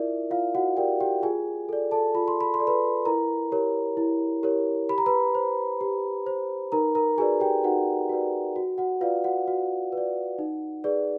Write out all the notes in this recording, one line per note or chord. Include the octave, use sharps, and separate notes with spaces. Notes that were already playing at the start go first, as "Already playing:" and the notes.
Already playing: E4 F4 A#4 D5 E5
F4 F5
F#4 F#5
G4 A#4 D5 G5
G4 G5
F4 G#4 G#5
A4 D5
A4 A5
F4 B5
C6
B5
C6
A4 D5
B4 B5
E4 A#4 A#5
G4 A#4 C#5
E4
G4 A#4 C#5
G4 B5
A#5
B4 B5
C5
G4
C5
D#4 A#4 A#5
A#4 A#5
F#4 G#4 B4 D5 G#5
G4 G5
D#4 F#4 F#5
F#4 B4 D5
F#4
F#4 F#5
F4 B4 D5 F5
F#4 F#5
F#4
B4
D5
D#4
G#4 B4 D5